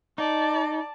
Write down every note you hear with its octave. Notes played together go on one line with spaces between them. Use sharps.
D#4 D5 A5